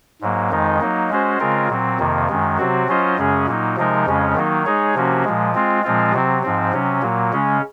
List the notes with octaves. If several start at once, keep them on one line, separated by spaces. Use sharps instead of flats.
G#2 F#3 A#3
F2 D#3 G#3 D#4
F#3 A#3 D#4
G#3 C#4 F#4 C5
C#3 G#3 C4 F4 A#4
A#2 F#3 C4
F2 C3 D#3 A#3
F#2 D#3 G#3
C3 F#3 C4 F#4
F#3 C#4 F4 C5 D#5
F#2 C#3 G#3 C#4 G#4
A#2 F#3 A#3 D#4
C3 F3 G#3 D#4 A#4
F2 C#3 G#3 C#4
D#3 F#3 A#3 D#4
G#3 D#4 G#4 C#5
C3 F3 A#3 C#4 F#4
A#2 F3 G#3
G#3 C4 F4
A#2 F3 G#3 C4 F4
C3 F#3 C4
G#2 F3 C4
C3 F#3 C#4
A#2 F#3 A#3
C#3 G#3 C#4